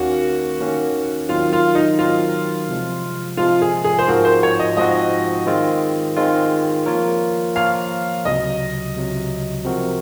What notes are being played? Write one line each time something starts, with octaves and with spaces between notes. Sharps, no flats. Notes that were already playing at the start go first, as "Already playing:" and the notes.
Already playing: D#2 D#3 A#3 C#4 F#4
D#2 D#3 A#3 C#4
D#3 F#3 C4 F4
F4
D#4
D#3 F#3 C4 F4
C3 F3 G#3
C3 F3 G#3 F4
G#4
G#4
C5
G#2 F3 C4 F#4 A#4
C5
C#5
D#5
G#2 F3 C4 F#4 D#5
D#3 G#3 C4 F4
D#3 G#3 C4 F4
F3 A#3 F4 A#4 C#5
F3 A#3 F4 A#4 C#5 F5
C#2 C3 F#3 D#5
C#2 C3 F#3
C3 F3 C4 F#4 A#4